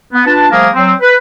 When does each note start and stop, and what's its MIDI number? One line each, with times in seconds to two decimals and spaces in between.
0.13 0.25 59
0.26 0.47 62
0.26 0.47 65
0.26 0.47 71
0.26 0.47 81
0.51 0.68 53
0.51 0.68 55
0.51 0.68 57
0.51 0.68 58
0.51 0.68 68
0.51 0.68 70
0.74 0.92 54
0.74 0.92 60
1.01 1.16 71